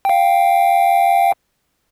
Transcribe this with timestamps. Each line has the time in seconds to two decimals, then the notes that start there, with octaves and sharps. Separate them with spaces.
0.05 F5 G5